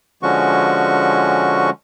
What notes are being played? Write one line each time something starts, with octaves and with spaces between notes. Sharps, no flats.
D3 F3 G#3 C#4 F#4 C#6